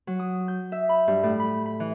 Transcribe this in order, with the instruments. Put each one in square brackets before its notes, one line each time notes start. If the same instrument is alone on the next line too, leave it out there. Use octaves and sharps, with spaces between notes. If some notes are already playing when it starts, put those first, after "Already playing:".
[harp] F#3
D#6
G6
E5
B5
G2
A2
B5
B5
E3